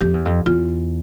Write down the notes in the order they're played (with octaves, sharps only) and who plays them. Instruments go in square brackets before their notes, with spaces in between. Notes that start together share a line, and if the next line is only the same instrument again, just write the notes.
[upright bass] F2 [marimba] G4
[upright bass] E2
F2
[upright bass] E2 [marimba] F4